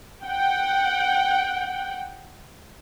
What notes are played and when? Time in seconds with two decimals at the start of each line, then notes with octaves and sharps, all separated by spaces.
0.25 F#5 G5